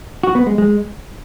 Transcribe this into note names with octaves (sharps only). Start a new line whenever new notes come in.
F#4
B3
G#3
G#3